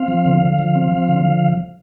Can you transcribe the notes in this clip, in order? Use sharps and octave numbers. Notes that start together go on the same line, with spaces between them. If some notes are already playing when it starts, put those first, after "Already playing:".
Already playing: C4 F5
F3
D3
D3
F3
C4
F3
D3
F3